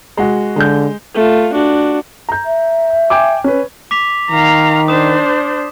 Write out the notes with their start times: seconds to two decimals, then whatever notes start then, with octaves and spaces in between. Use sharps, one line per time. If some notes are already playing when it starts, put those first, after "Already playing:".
0.17 G#3 F#4
0.56 D3 G#3 G6
1.14 A3 F4
1.53 D4 F#4
2.29 A#5 G6
2.46 E5
3.10 G5 G#5 D6
3.44 C#4 B4
3.91 D6 B6 F7
4.31 D#3 F5 A#5
4.88 D4 C5 D#6 E7